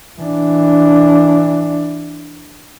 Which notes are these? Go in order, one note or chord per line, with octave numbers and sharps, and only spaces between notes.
E3 D4